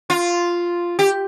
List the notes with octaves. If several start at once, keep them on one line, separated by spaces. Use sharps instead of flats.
F4
G4